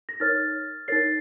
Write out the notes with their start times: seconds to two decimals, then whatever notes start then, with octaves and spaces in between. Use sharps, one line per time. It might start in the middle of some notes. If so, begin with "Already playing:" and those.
0.09 A#6
0.20 D#4 A#4 C#5 F6 A6
0.88 D#4 A#4 C#5 A6 C7